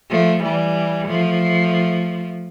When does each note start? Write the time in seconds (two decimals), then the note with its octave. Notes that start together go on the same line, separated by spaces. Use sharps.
0.10 F3 A3
0.43 E3 G3
1.08 F3 A3